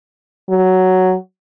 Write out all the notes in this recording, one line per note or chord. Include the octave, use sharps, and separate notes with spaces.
F#3